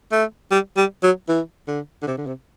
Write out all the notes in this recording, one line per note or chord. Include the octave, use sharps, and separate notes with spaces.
A3
G3
G3
F#3
E3
D3
D3
C3
D3
C3